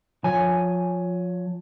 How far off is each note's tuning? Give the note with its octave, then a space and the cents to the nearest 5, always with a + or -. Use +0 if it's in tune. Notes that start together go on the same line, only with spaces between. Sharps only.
F3 +25 C#5 +10 G#5 +0